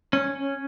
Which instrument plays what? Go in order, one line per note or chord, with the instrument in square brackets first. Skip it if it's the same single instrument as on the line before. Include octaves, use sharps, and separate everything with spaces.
[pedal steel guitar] C#4